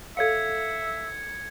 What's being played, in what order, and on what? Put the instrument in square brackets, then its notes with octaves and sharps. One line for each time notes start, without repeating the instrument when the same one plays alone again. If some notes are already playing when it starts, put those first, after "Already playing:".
[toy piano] A4 C#5 F5 [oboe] E5 [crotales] G#6 C#7